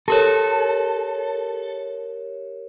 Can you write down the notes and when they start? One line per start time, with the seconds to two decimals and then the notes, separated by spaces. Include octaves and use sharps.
0.08 G4 A4 A#4 C#5